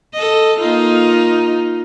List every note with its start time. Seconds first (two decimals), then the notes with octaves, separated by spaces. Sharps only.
0.14 A4 D#5
0.60 A#3 D#4 F4